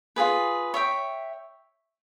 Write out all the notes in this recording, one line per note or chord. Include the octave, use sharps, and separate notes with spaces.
F4 G#4 B4
C#5 E5 G5